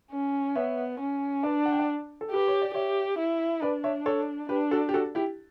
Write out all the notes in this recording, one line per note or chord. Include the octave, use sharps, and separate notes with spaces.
C#4
B3 C#5 E5
C#4
D4 B4 D5
F#5
G5
D5 F#5
A4
G4 B4
C#5
D5
G4 C#5 E5
E4
D4 B4 D5
C#5 E5
A4 C#5
D4 G4 B4
F#4 A4
G4
F#4 A4
E4 G4